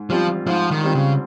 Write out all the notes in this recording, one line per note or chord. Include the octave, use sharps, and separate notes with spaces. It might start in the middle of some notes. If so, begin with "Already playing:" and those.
Already playing: G#2
F3 G3 C4 F4
G#2 F3
D#3
G3 C4 F4
C#3